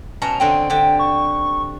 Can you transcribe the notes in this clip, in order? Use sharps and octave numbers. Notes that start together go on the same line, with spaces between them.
B2 C#4 A5 A#5
D3 C4 D#5 G5
D3 G4
C#6